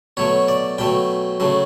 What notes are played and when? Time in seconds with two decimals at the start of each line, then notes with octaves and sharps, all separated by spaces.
0.17 B2 F#3 A3 C#5
0.48 D5
0.78 B2 F#3 A3 G5
1.40 C#3 F#3 A3